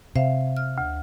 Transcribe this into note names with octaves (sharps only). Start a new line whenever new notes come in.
C3 C5 E5 F5
F6
D2